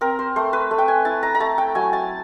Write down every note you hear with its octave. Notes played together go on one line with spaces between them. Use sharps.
C4 A#4
C5
A3 C5
B4
A3
G5
G#5
E4 A5
A#5
A#5
A3 A5
G5
F#3 G#5
A5